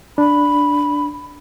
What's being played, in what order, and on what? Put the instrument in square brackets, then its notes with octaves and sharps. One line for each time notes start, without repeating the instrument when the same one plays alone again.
[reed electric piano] D4 [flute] B5